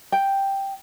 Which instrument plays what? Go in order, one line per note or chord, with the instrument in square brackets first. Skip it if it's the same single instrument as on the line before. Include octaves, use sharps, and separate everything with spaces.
[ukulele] G5